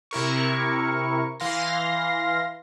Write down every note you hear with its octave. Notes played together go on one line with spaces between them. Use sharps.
C3 E4 A#4 C#6
E3 F5 C6 A#6